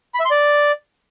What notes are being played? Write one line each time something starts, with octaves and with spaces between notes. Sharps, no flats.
B5
E5
C6
D5